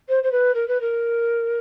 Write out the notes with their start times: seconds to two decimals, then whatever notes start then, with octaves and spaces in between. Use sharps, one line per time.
0.08 C5
0.23 C5
0.31 B4
0.54 A#4
0.67 B4
0.80 A#4